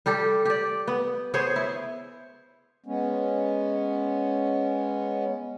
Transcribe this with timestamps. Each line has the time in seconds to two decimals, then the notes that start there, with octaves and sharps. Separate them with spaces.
0.06 G3 G4 A4
0.45 G4 D5
0.88 B3
1.34 B3 G#4 C5 C#5
1.56 E4
2.86 G#3 B3 C#4